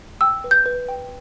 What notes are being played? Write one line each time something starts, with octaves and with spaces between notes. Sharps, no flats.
G5 E6
B4
G6
B4
G5